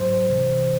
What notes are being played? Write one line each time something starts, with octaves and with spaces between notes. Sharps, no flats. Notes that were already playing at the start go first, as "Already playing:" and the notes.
Already playing: G#2 F#3 C5
C2 C3 E3